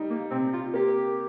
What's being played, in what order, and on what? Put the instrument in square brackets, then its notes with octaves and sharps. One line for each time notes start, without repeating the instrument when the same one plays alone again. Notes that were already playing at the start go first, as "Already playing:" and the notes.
Already playing: [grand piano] G3 D#4
[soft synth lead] A#3
[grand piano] C3 [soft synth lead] C4
[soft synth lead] F4
[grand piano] A#3 [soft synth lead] G4